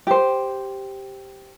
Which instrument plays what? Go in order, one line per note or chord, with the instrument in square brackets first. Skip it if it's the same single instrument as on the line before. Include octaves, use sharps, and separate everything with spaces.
[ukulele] G4 C5